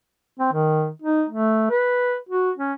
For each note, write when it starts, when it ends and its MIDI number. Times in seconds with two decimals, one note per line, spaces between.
0.39 0.50 60
0.53 0.90 51
1.02 1.24 63
1.30 1.68 57
1.70 2.17 71
2.29 2.51 66
2.58 2.73 61